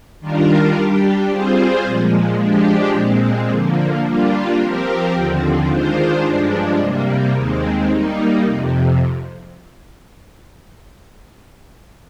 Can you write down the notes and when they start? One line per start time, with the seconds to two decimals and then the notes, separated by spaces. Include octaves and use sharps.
0.20 D#3 G3 D4 F4 A#4
0.75 G3 D4 G4
1.29 G3 C4 F4 G#4 C5
1.84 A#2 F3 G#3
2.39 F3 G#3 D4 G4
2.94 A#2 G#3 C4
3.49 D3 F3 A#3
4.04 G3 A#3 D4 F4
4.59 F3 C4 G4 A#4
5.14 D#2 D3 F3 C4
5.68 D#3 G#3 D4 F4 C5
6.24 G2 F3 G#3 D4
6.78 C3 G3 A#3
7.34 D#2 D#3 G#3 C4
7.88 G3 A#3 D#4
8.43 F2 C3